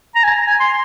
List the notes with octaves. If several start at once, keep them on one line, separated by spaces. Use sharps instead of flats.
A#5
G#5
G#5
C6